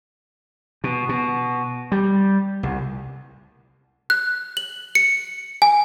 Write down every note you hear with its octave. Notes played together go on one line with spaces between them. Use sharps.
B2
B2
G3
C2
F#6
F#7
C#7
G#5